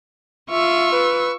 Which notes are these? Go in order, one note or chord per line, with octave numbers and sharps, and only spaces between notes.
F4 E5 C#6 E6
B4